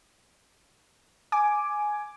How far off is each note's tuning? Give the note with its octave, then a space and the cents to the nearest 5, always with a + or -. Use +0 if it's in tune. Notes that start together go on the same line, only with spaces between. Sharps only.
G#5 +10 D6 +5